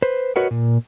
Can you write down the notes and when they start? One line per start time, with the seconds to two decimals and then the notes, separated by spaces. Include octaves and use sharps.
0.02 B4 C5
0.36 F#4 A#4 B4 C#5 D#5 F#5
0.51 A#2